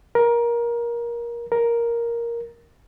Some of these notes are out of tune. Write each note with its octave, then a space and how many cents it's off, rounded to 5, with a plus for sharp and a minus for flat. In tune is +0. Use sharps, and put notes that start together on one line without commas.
A#4 +20
A#4 +5